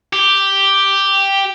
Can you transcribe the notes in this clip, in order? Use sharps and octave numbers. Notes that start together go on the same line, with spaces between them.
G4